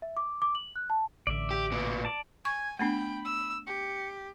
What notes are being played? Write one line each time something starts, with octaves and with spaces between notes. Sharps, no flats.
E5
D6
D6
F#7
F#6
A5
A1 D3 D5 E5
G4
A#2 B3
D5 A5
G#5 C#6 G#6
A3 B3 D4 G5 B5
E6
G4 C#7